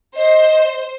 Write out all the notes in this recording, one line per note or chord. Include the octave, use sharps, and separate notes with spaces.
C5 D#5